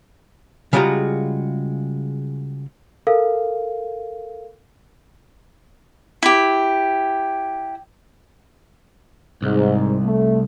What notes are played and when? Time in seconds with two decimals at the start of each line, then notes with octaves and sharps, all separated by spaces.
0.73 C#3 G3 G#3 F4 F#4 A#5
3.07 A4 A#4 F5
6.23 E4 G4
9.43 C2 G#2
10.05 A3